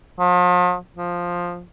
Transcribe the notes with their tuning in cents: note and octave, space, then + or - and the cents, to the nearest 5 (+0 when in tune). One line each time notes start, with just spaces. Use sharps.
F3 +40
F3 +5